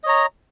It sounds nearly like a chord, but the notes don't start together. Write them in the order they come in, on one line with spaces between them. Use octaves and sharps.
D#5 C#5 A#5